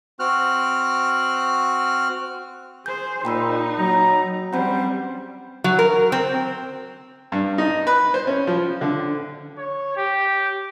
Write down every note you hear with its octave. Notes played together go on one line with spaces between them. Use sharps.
C4 F#4 F6 F#6
G#4 C5 G6
A#2 D#4 G5 B5 E6
F#3 A#5
E2 G3 C4 C#4 C5 F#5 B5 G6
F#3
A#4
C4
G2
D#4
B4
C5
C#4
F3
D3
C#5
G4